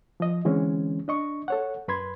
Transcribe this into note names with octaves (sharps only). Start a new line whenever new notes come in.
F3 D#5
D3 E3 G#3 C4 C#4
D4 D#5 C#6
A4 C#5 F#5
F#2 B4 B5 C6 G#6